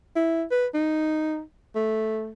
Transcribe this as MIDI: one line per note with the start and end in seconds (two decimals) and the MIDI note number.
0.16 0.44 64
0.51 0.67 71
0.74 1.41 63
1.75 2.32 57